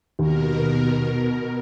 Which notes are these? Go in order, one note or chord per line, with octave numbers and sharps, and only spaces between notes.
D#2 B2 A#4